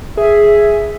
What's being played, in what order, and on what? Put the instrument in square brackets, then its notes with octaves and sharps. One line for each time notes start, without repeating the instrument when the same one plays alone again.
[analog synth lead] G#4 [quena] E5